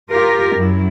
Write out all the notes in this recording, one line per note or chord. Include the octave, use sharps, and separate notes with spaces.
F4 G4 A#4
F#2 F#3 E4